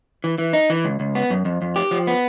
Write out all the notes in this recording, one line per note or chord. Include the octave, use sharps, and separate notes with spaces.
E3
E3
D#4
E3
C#2
C#2
B3
F#2
F2
F2
G4
F3
B3